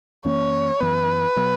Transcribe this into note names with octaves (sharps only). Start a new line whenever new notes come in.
F#2 E3 A#3 C#4 C#5
F#2 E3 B3 B4
B2 F#3 B3